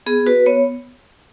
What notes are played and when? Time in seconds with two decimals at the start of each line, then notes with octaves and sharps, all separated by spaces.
0.06 B3 G#4
0.26 F#4 B4
0.46 B3 C#5